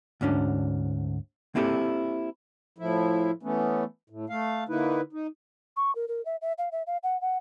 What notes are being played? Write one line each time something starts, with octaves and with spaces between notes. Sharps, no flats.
D2 G#2 C#4 D4
A#3 C4 E4 G4 A4
A2 F3 E4
E3 A3 B3 C#4
A2
A3 F5
D3 A#3 D#4 E4 B4
D#4
C#6
A#4
A#4
E5
E5
F5
E5
F5
F#5
F#5